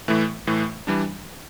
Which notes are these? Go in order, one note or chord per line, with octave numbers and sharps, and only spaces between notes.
A2 E3 A3
A2 E3 A3
E3 G3 D4